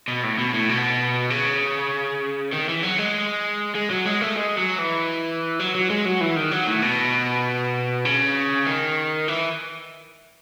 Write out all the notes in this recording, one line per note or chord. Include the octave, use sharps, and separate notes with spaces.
B2
A2
B2
A2
B2
C#3
D#3
E3
F#3
G#3
G#3
F#3
G#3
A3
G#3
F#3
E3
F#3
F#3
G#3
F#3
E3
D#3
F#3
A2
B2
C#3
D#3
E3